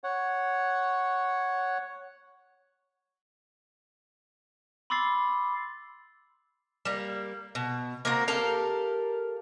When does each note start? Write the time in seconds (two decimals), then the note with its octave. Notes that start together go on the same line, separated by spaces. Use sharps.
0.04 C#5 F#5
4.90 B5 C6 D6 E6 A6 C7
6.85 G3 A#3
7.55 B2
8.05 A#3 C4 F#4 A#4
8.28 G4 A4 A#4 F5